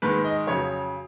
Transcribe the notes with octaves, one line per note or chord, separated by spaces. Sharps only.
G#2 D#3 G#3 B4
D#5
F2 C#3 F#3 C#5